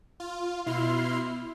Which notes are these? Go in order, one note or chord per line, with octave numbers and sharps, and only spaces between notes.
F4
B2 E4 C6 F6